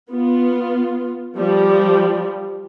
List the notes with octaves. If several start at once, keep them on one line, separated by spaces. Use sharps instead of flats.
B3 F4
F3 G3